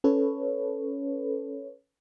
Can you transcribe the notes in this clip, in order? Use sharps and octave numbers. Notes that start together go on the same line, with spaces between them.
C#4 A4 B4 C#5